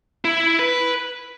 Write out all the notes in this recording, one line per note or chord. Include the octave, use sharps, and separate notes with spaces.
E4
B4